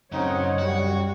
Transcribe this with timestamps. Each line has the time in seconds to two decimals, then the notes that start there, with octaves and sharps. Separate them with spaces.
0.12 F#2 A2 C#3 C4 D#4 C#5 F#5
0.59 G3 F#4